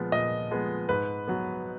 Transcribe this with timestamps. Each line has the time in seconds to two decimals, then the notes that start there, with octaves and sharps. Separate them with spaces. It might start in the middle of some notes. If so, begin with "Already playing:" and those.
Already playing: A#2 F3 G#3 B3
0.12 A#2 D#5
0.51 F3 G#3 B3
0.89 G#2 B4
1.27 F#3 B3